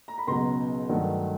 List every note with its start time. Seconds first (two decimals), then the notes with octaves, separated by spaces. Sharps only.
0.08 A#5
0.18 B5
0.27 C#2 B2 F#3 A#5 C6
0.89 G2 D#3 F#3 A3